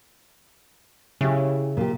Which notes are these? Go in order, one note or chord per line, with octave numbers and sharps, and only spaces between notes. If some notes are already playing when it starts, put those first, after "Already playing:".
C#3 E4 G4
A#2 G4